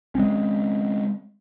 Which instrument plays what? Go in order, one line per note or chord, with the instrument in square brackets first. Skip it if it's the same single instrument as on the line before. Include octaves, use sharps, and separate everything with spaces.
[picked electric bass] G#3 A#3 C4 C#4